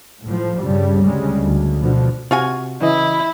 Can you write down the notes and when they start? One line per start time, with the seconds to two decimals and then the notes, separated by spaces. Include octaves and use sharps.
0.24 A2 F3
0.61 G2 C#3 G3
1.01 D2 C#3 G3 G#3
1.43 D2
1.80 B2 D3 F3
2.31 C3 F4 F#4 G#5
2.82 C#3 E3 E4 D#5